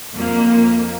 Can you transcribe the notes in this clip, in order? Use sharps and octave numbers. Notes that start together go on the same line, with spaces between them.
F2 A#3